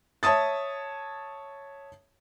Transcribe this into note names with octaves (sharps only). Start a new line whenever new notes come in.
C#5 E5 A5 D#6 A6